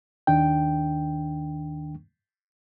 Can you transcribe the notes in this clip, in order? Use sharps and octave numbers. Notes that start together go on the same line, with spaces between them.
D#2 D#3 D4 G5